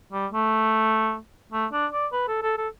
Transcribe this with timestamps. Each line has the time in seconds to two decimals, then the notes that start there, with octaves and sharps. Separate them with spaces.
0.13 G3
0.33 A3
1.52 A3
1.73 D4
1.93 D5
2.13 B4
2.28 A4
2.43 A4
2.57 A4